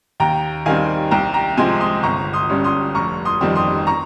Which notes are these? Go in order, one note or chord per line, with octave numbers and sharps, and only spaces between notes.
D#2 G5 A#5
D#3 G3 C4 F5 G#5
C2 G5 A#5
G5 A#5
C3 F3 G#3 C4 G#5 C6
C6 D#6
G1 A#5 C#6
C6 D#6
G2 G3 C#4
C6 D#6
F1 A#5 C#6
C6 D#6
F2 D#3 G3 C4
C6 D#6
A#5 C#6